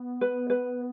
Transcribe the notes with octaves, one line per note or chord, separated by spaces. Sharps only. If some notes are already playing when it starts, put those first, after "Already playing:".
Already playing: B3
B4
B4